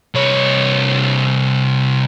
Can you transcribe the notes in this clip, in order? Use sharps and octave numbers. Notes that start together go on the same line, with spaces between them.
C2 C#5